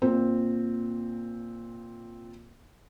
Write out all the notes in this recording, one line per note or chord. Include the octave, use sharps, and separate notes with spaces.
A#2 C4